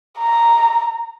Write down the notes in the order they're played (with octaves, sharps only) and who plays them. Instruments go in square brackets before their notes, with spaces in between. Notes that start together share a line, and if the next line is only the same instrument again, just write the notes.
[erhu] A#5